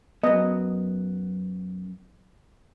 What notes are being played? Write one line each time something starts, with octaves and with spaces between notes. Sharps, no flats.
F#2 B3 D#5